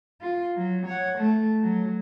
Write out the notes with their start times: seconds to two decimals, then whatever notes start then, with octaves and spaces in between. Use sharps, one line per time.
0.21 F4
0.56 F#3
0.86 C#5 F#5
1.18 A3
1.62 F#3